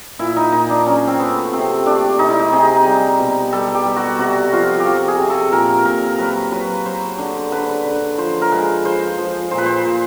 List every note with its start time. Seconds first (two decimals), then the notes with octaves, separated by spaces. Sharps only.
0.19 A#2 E4
0.36 D#4
0.52 A#2 D#4
0.70 D4
0.86 F#3 C#4
1.07 C4
1.19 A3 B3
1.53 C3 C4
1.86 A3 D4
2.19 C3 D#4
2.29 E4
2.39 D#4
2.52 C3 G#4
2.86 G3
3.19 B2
3.53 G3 A4
3.74 G4
3.86 G3
3.96 F#4
4.19 C3 F#4
4.53 F3 F4
4.80 G4
4.86 F3 F#4
5.08 G#4
5.19 C3
5.30 A4
5.52 A#2 A#4
5.85 A#2 A#4
6.18 F#3 B4
6.52 F#3 B4
6.86 F#3 C5
7.18 D3
7.52 D3 B4
7.85 D3
8.18 F3 C5
8.41 A#4
8.52 G#3 B4
8.85 F3 C5
9.18 F3
9.51 A#2 C5
9.58 B4
9.66 C5
9.85 A#2